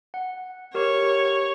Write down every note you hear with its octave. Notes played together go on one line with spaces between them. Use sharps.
F#5
G4 A#4 C#5 C#6